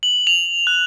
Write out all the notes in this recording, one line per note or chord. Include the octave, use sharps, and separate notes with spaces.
F#7
F7
F#6